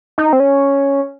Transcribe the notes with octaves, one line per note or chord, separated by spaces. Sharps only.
D#4
C4
C#4